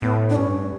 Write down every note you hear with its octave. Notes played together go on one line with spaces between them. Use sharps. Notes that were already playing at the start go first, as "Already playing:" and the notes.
A2 B3
D4
G2 C#4